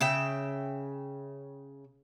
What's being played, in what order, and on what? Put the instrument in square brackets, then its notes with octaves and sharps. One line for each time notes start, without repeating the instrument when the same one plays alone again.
[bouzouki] C#3 E5 G5